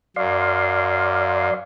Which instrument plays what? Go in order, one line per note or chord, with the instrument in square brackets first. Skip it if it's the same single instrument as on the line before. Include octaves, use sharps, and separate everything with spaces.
[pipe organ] F#2 [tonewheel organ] D5 F5 C6